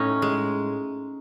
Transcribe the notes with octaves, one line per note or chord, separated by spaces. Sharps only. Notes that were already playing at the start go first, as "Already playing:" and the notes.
Already playing: A2 C#4 D#4
G#3